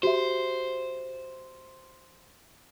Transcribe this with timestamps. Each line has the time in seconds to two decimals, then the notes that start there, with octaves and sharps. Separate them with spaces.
0.03 F#4 G4 C5 E5